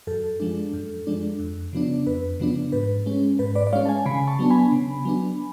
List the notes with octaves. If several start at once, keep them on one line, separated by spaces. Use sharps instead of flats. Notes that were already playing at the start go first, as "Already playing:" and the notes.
F#2 A4
F3 G#3 D4
F#2
F3 G#3 D4
F2
C#3 F3 B3 D4
F2 B4
C#3 F3 B3 D4
G#2 B4
G#3 C#4
G#2 B4
B4 D5
D5
G#3 C#4 C#5 F5
A5
F5 G#5
C#3 G#5 B5
A5 C#6
F#3 B3 D4
G#5 B5
C#3
F#3 B3 D4